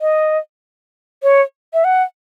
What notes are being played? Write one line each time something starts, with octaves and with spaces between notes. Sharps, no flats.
D#5
C#5
E5
F#5